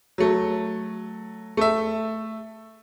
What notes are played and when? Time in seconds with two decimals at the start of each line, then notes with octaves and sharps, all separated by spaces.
0.18 F#3 A3
1.57 A3 E5